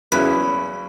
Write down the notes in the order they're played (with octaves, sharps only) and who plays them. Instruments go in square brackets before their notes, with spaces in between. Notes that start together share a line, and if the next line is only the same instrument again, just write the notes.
[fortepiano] E2 C#3 F#3 C#4 E4 [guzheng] B4